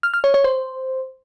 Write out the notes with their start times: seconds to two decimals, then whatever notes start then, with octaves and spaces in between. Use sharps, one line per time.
0.03 F6
0.14 F6
0.24 C#5
0.34 C#5
0.44 C5